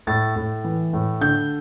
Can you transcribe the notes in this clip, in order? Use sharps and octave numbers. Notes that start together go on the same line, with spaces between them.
A2 A6
A2
E3
A2
D3 G6